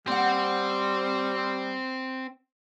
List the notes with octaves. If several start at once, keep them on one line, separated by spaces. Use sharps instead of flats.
G3 A#3 C4 C5 F#5